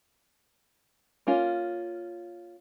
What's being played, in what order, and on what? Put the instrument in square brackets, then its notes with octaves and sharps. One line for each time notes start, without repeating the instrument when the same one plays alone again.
[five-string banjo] A#3 C#4 F4